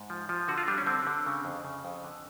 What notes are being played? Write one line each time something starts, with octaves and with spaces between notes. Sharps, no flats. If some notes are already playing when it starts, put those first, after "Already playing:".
Already playing: G#2
F3
F3
D3 F#4
F4
G3 D4
C#4
D3 C4
D3
C#3
F2
C#3
F2
D3